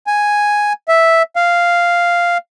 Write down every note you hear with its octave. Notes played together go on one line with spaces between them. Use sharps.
G#5
E5
F5